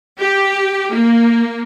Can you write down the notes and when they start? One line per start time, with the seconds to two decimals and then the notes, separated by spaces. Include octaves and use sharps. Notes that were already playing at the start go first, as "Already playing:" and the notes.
0.19 G4
0.94 A#3